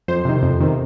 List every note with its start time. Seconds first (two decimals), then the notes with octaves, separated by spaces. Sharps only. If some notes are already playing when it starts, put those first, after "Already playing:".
0.08 F2 C5
0.25 C3 D#3
0.42 F2
0.60 C3 D#3